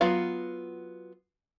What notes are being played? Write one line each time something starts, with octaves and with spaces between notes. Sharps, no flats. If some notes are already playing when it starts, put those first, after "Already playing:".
F#3 B3 F4 F5